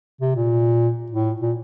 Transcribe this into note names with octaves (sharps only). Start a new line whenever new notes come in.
C3
A#2
A2
A#2